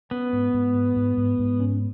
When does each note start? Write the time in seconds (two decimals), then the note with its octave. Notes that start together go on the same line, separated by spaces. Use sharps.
0.11 B3 C#4
0.33 G#2
0.54 G#2
0.75 G#3
0.96 G#2
1.17 G#2
1.39 G#2
1.60 C#4